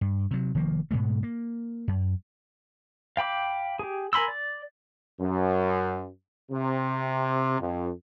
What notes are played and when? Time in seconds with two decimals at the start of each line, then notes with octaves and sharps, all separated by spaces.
0.01 G2
0.31 C3 F#3
0.55 F1 D#3 F3 A#3
0.91 G#2 B2 G#3 A3
1.23 A#3
1.88 F#2
3.17 F5 G5 B5 D6
3.79 G4 G#4
4.13 A#4 G#5 B5 C6 E6
4.28 D5
5.20 F#2
6.51 C3
7.59 F2